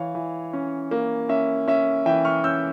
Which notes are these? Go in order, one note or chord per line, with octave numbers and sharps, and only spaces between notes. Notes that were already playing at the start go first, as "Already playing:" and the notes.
Already playing: E3 C#5 F5
E3
C#4
A#3
C#4 E5
C#4 E5
E3 E5 G5
C#6 F6
C#4 E6 G6